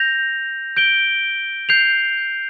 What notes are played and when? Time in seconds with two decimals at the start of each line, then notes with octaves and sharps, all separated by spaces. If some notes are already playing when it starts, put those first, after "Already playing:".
Already playing: G6 A#6 F7
0.77 G6 D7 G7
1.69 G6 C7 F7